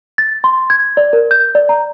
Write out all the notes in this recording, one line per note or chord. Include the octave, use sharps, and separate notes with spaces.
A6
C6
G#6
D5
A#4
G6
D5
A#5